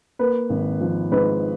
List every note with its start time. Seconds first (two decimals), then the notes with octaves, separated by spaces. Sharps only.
0.19 A#3 B4
0.49 G#1
0.81 F3
1.11 G#2 B4